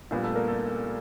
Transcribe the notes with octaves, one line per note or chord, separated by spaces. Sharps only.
A#1 A#2 G3 B3
A3 A4
A#3 A#4
A3 A4